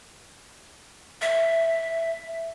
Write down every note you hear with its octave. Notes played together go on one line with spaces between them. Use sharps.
E5